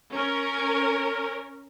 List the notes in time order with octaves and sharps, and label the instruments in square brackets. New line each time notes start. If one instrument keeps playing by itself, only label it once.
[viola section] C#4 A#4